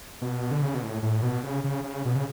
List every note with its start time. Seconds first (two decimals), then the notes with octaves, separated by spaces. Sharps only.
0.22 B2
0.51 D3
0.62 C#3
0.74 B2
0.82 A2
1.02 A2
1.22 B2
1.43 C#3
1.64 C#3
1.84 C#3
2.05 B2
2.16 C#3